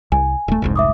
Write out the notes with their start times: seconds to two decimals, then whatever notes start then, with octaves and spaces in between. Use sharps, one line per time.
0.12 C2 G#5
0.48 D#1 A3
0.62 F1 C2 G#2
0.76 E5 D6 D#6